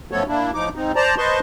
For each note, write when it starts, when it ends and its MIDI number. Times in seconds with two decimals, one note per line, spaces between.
0.12 0.23 42
0.12 0.23 53
0.12 0.23 57
0.12 0.23 59
0.12 0.23 69
0.12 0.23 73
0.28 0.51 58
0.28 0.51 62
0.28 0.51 64
0.54 0.69 45
0.54 0.69 53
0.54 0.69 63
0.54 0.69 86
0.76 0.92 44
0.76 0.92 60
0.76 0.92 63
0.96 1.15 72
0.96 1.15 74
0.96 1.15 81
0.96 1.15 82
1.18 1.40 71
1.18 1.40 72
1.18 1.40 75
1.18 1.40 81
1.18 1.40 84
1.18 1.40 85